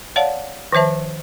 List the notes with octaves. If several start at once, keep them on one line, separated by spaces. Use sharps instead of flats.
C#5 D5 F5 F#5 A5
D#3 F3 C5 E5 A5